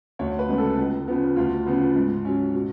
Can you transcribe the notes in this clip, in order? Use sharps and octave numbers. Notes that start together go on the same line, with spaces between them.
D2 C#5
B4
C#3 G#3 B3
A4
C#2
C#3 F3 B3
D2 F4
C#3 F3 B3
G#2
F#3 C#4
B2